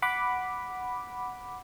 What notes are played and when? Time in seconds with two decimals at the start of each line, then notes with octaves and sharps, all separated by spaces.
0.02 F#5 B5 D6